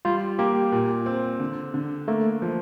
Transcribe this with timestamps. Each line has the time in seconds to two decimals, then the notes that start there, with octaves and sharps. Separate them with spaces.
0.05 G3 F4
0.39 A#3 G4
0.72 A#2
1.06 C4
1.40 D3
1.74 D3
2.08 A3 A#3
2.42 F3